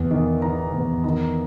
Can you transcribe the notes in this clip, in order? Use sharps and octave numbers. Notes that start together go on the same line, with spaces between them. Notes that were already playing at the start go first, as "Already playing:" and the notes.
Already playing: E2
D#3
D#3 A#5
E2
D#3 A#5